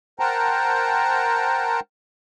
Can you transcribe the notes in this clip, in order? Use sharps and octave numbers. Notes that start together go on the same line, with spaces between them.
A#4 C5 F#5 G5 A5 A#5